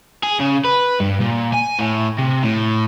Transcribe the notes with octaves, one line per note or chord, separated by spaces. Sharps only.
G#4
C#3
B4
G2
A#2
G#5
A2
C3
A2